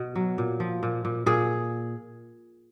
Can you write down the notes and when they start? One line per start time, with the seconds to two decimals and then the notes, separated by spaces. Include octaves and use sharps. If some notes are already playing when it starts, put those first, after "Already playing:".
Already playing: B2
0.15 F#3
0.38 A#2
0.60 F3
0.83 A#2
1.05 A#2
1.26 A#2 G#4